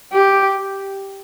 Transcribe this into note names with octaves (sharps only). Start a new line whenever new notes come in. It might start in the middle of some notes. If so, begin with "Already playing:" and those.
G4